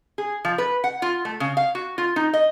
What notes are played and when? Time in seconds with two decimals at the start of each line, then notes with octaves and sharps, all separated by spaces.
0.18 G#4
0.45 F3
0.58 B4
0.84 F#5
1.02 F4
1.25 A3
1.40 C#3
1.57 F5
1.75 F#4
1.98 F4
2.16 D#4
2.34 D#5